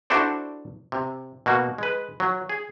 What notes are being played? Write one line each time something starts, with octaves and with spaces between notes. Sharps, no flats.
D4 E4 F#4 A4 C5 D5
C3
B2 A#3 F#4
G#3 B4
F#3
G#4